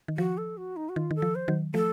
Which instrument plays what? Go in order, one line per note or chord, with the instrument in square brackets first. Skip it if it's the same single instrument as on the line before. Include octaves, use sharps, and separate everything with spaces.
[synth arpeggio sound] D#3
[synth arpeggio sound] F3 [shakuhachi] F#4
[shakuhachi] A4
F#4
D#4
F#4
[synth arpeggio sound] D#3 [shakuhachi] F4
[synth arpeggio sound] D#3 [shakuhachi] A4
[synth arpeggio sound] F3
[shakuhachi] C5
[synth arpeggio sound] D#3 F#3
[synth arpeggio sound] F3 A3 [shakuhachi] A4